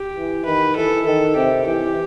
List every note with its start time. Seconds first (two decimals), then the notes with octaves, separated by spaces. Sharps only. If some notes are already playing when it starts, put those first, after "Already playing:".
Already playing: G4
0.16 E3
0.45 D#3 B4
0.76 E3 A4
1.06 D#3 A4
1.35 C3 G4
1.66 E3 G4